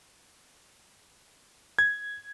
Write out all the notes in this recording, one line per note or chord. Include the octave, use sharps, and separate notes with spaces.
G#6